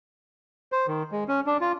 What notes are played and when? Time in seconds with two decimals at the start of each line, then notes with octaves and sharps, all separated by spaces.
0.72 C5
0.87 D#3
1.12 G#3
1.28 C#4
1.46 D4
1.61 F4